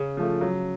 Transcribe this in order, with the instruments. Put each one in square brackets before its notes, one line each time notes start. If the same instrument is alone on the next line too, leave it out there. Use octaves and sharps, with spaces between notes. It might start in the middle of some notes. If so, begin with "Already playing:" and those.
Already playing: [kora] C#3
[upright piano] F3 A3
F#3